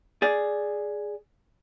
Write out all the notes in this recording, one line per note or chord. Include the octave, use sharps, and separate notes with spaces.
G#4 D5